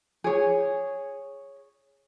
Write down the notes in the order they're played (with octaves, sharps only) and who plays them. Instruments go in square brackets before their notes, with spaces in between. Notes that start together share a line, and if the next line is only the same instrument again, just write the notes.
[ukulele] G#4 C#5